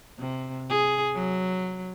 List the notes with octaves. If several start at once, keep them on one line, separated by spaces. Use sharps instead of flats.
C3
G#4
F#3